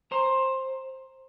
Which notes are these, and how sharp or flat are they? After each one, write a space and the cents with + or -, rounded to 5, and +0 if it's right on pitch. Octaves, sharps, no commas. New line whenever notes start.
C5 +15 A#5 +0